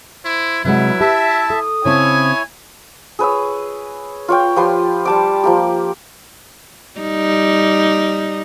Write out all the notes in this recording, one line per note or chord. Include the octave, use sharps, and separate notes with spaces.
E4 C5
C3 F#3 G#3 E4 B4 F#5
G4 E5 A5
A4 D#6
C#3 C4 E4 C#5 G#5 A5
G#4 B4 C#5 E6
F4 C#5 G5
F3 G4 B4 C6
G3 A5 D6
F3 A#3 G4
G3 D#4